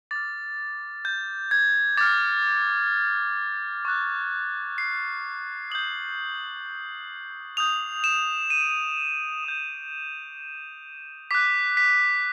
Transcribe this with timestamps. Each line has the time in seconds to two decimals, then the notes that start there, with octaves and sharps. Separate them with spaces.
0.11 D6 F6 A6
1.05 G6
1.51 G#6
1.97 D6 F6 A6
3.85 C#6 F#6
4.78 C7
5.70 D#6 G6 F#7
7.57 D#6 G6 F7
8.04 E7
8.50 D#7
8.61 D7
8.70 D#7
9.44 D#6 G6
11.31 D6 F#6 B6
11.77 B6